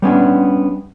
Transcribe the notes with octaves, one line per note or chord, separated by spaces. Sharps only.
G3 B3 C#4 D4